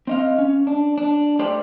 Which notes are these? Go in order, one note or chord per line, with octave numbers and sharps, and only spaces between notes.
C4 D#5 F5
C#4
D4
D4
A3 G4 C5 D5